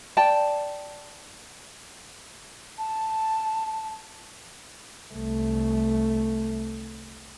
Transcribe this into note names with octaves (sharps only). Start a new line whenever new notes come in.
D5 G5 A5
A5
C2 A3